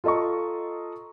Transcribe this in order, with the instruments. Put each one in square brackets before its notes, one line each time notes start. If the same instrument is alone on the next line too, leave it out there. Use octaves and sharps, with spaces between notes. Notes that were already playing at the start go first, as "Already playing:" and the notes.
[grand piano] F4 A4 D#5 A#5 C#6